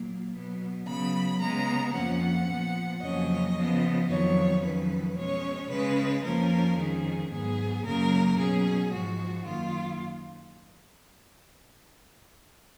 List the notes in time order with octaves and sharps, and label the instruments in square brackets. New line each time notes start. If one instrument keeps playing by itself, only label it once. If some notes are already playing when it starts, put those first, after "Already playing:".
Already playing: [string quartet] A#2 F#3 A#3
B2 F#3 B3
C#3 F#3 B3 B5
C#3 G#3 B3 A#5
F2 F3 A#3 C#4 F#5
A#2 F3 B3
F2 C#3 F#3 A#3 C#4 D#5
C#3 F3 B3
F2 D#3 F#3 B3 C#5
F2 D#3 F#3 C#4 B4
B2 G#3 C#4 C#5
C#3 G#3 C#4 B4
F2 F3 A#3 C#4 A#4
F2 D#3 G#3 C#4 G#4
G#2 F#3 B3 G#4
F#2 C#3 F#3 A#3 A#4
B2 F#3 C#4 G#4
G#2 F3 G#3 F#4
F#2 D#3 A#3 F4